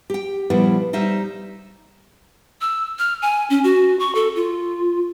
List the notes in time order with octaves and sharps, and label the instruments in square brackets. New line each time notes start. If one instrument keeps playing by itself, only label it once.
[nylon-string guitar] G4 G5
A#2 F3 G3 B3 E4
G3 D#4 C5 E5
[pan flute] E6
F6
G#5
C#4
F#4
C#6
A4
F4